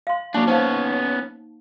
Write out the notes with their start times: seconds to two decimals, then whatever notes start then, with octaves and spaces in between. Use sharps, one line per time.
0.07 F5 C6
0.34 F#3 A#3 D4 A5 C#6
0.48 B3 C#4 D#4 C5 F5 F#5